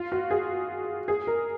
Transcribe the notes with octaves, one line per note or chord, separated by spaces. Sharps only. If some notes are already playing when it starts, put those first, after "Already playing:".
Already playing: F4
F#4
G#4
G#4
A#4